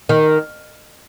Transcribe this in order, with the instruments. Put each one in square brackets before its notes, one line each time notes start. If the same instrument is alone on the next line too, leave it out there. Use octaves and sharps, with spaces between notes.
[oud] D#3